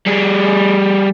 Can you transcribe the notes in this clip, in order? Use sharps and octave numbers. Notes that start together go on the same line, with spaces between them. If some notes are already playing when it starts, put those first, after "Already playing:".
G3 G#4